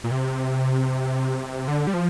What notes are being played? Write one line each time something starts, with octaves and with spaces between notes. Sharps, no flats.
A#2
C3
D3
G3
F3